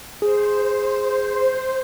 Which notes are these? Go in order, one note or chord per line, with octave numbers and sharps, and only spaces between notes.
G#4 C5